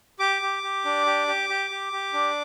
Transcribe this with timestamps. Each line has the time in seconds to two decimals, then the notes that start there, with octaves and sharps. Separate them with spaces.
0.19 G4 D6
0.42 G4
0.63 G4
0.85 D4
1.06 G4
1.27 G4
1.49 G4
1.71 G4
1.93 G4
2.13 D4